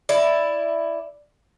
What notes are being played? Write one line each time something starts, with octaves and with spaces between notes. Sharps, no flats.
E4 D5